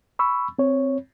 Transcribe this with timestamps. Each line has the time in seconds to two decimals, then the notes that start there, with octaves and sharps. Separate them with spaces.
0.19 B5 C#6 E6
0.59 C4 C#5